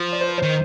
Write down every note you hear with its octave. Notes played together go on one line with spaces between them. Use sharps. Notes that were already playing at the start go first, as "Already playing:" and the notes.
Already playing: F3
D5
C5
B4
D#3 C5